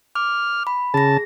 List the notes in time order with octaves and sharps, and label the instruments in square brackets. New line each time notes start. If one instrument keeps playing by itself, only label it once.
[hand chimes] D6 [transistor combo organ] F6
[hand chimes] B5
[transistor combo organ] C#3 A5 [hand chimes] G#4 A#6